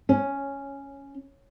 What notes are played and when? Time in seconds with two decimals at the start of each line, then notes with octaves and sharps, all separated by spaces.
0.09 C#4